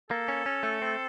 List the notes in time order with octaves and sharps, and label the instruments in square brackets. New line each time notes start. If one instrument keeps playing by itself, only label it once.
[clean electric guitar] A#3 [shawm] A4
[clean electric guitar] C#4
C#4
A3
C4